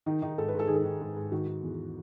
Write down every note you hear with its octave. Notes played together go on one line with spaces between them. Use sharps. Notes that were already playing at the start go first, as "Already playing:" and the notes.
D#3 D#4
D#3 D#4
G#2 A4
B4
G#2
A4
D#3 G#4
A4
D#3
G#2
G#2
D#3 F#4
D#3
E2